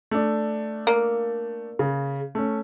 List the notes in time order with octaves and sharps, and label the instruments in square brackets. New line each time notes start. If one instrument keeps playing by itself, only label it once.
[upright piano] A3 D4
[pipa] A#3
[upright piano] C#3
A3 C#4